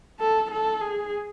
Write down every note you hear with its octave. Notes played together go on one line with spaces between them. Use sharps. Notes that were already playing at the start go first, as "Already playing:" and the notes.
A4
A4
G#4